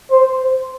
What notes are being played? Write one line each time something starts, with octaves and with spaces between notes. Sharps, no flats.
C5